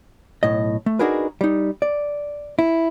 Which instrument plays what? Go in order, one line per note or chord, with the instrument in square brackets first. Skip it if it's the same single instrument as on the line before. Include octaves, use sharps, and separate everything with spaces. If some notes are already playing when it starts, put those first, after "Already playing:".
[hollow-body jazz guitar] B1 A2 D#5
A3
D4 D#4 F#4 G#4 A#4 B4
G3 D#4
D5
E4